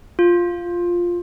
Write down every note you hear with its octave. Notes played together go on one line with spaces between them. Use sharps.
F4